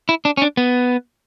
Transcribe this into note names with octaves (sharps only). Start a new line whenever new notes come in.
E4
D4
C#4
D4
B3